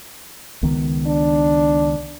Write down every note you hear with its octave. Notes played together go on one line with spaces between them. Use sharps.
C#2 D#3 B3
D4